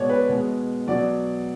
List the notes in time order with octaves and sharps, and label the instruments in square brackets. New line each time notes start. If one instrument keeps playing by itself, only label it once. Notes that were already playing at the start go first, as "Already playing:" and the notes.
Already playing: [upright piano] B2 G#3 C#5 D5
B4
B2 G#3
B2 F#3 D5